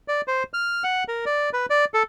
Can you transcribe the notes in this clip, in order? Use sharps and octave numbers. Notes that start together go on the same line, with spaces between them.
D5
C5
F6
F#5
A#4
D5
B4
D5
A4